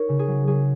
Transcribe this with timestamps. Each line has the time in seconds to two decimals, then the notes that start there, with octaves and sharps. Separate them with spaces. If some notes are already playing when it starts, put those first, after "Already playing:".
Already playing: D#4 A#4 C#5
0.09 C#3
0.19 G#4
0.28 F#3
0.47 F#3 G#4